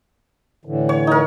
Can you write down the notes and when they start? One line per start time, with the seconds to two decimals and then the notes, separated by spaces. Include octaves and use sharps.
0.65 A2 D3 E3
0.89 C#5
1.07 D#4 A#4